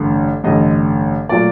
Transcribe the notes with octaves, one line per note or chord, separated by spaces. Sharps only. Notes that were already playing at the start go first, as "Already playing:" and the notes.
Already playing: A1 G2 D3
A1 G2 D3 D#5
A#2 F#3 A3 D5